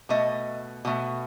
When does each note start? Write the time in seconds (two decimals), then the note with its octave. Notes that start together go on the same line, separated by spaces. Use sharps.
0.09 B2 A3 D#5
0.85 B2 A3